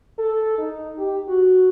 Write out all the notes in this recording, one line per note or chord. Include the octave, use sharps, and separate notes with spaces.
A4
D#4
G4
F#4